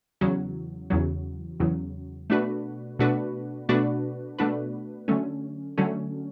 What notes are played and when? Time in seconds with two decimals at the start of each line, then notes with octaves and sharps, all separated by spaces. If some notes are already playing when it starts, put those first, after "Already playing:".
0.21 E2 C#3 F#3
0.90 E2 C#3 F#3
1.60 E2 C#3 F#3
2.30 B2 A3 D4 F#4 B4
2.99 B2 A3 D4 F#4 B4
3.69 B2 A3 D4 F#4 B4
4.38 B2 A3 D4 F#4 B4
5.08 D3 F#3 A3 C#4
5.78 D3 F#3 A3 C#4